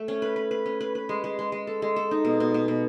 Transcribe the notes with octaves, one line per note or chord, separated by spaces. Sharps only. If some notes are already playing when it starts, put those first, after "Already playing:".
Already playing: A3
C#4
B4
B4
B4
C#4
B4
B4
G#3
G#3
G#3
G#3
A4
G#3
A4
D#4
B2
B2
B2
B2